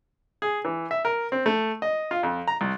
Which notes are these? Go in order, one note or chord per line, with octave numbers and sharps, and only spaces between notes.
G#4
E3
E5
A#4
C4
A3
D#5
F4
F2
A#5
C2